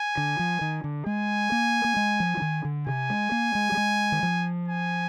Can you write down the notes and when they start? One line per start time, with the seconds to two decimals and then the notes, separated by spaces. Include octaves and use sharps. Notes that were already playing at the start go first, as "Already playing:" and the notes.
Already playing: G#5
0.17 D3
0.39 F3
0.61 D#3
0.84 D3
1.06 G#3 G#5
1.52 A#3
1.84 A#3
1.97 G#3
2.20 F3
2.37 F3
2.42 D#3
2.65 D3
2.87 C3 G#5
3.10 G#3
3.32 A#3
3.55 G#3
3.72 G3
3.77 G#3
4.12 D#3
4.23 F3
4.68 G#5